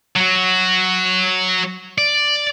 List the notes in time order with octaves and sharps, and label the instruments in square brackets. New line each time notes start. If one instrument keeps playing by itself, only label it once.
[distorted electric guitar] F#3 F#4
D5